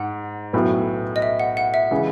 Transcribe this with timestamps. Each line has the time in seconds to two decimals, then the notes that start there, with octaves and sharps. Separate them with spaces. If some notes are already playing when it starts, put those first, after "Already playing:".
Already playing: G#2 F#5
0.53 B1 A2 F#3 B3
1.16 D#5
1.22 E5
1.40 F#5
1.57 F#5
1.74 E5
1.91 C#3 E3 G#3